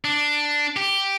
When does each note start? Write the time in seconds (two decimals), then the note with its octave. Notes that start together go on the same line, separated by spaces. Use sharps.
0.05 D4
0.76 G4